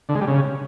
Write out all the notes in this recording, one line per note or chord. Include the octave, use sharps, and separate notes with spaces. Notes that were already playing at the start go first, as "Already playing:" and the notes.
D3
G#3
G3
C#3